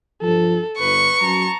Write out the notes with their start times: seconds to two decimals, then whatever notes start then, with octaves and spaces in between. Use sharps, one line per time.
0.22 G2 F3 A4
0.79 G1 B4 C#6
1.21 F#2 F#3 A5 A#5